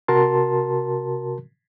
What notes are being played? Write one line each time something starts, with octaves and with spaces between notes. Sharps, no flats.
C3 F#4 A#4 A5 C6